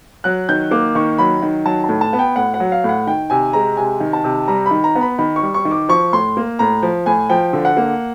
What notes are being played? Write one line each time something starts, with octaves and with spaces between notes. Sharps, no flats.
F#3 F#6
D#3 G6
A#3 D6
D#3 C#6
F#3 B5
D#3
F#3 A5
A2 A5
A5
B3
G5
A2 F#5
F#5
F#3
F5
A2
F#5
D#3 G5
C3 G#5
G#3 A#5
C3 G#5
D#3
A5
C3
G3 A#5
B5
D#3
A#5
B3
B5
D#3 B5
C#6
G3
C#6
D#3
D6
F3 C#6
A2 C6
A#3
A2 A#5
F3
A2 G#5
F3 G5
D3
F#5
A#3